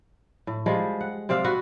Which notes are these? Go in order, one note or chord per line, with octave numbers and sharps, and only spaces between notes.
A2
F3 G3 G#3
F#5
C3 C4 D5 F5
F#4 B4 F#5